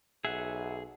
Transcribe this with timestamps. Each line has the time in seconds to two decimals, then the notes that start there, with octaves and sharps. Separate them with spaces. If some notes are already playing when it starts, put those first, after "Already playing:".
0.25 B1 G#4 E5 F#5